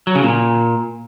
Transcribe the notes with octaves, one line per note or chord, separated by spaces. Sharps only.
F#3
C#3
A#2